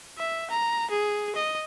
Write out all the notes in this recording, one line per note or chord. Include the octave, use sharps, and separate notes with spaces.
E5
A#5
G#4
D#5